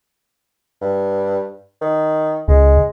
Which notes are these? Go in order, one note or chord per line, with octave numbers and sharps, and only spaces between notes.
G2
D#3
C#2 G#3